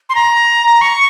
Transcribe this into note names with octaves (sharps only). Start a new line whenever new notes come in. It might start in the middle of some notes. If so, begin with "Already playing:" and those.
C6
A#5
C#6